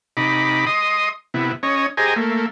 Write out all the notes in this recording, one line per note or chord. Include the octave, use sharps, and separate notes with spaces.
C3 D#4 B5 D6
D#5 C6 D#6
C3 B3 E4
C#4 C#5 D#5
G4 G#4 C5 D#5 G#5 A#5
A3 A#3